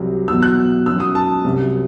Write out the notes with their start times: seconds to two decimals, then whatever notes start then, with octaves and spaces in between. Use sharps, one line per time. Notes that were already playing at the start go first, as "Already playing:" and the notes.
Already playing: C2 C3 F#3
0.28 E2 B2 F#3 E6
0.42 F#6
0.86 F#2 F#3 E6
1.00 D#6
1.15 A5
1.44 C2 C3 F#3